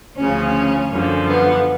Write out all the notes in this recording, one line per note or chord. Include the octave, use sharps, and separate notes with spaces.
D2 C#3 F3 C#4
F#2 D3 F3
B3